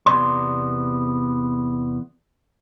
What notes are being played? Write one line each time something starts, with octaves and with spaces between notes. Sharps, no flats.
E2 C3 F#3 B3 D5 C6